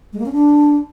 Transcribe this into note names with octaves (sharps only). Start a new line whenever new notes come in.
G#3
A#3
C#4
D4